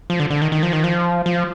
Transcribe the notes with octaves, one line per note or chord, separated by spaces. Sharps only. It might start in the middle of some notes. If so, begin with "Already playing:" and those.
F3
D3
D3
D#3
D#3
F3
D#3
F3
F3